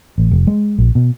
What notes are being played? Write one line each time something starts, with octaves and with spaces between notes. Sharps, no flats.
A1
F1
G#3
A#1
B2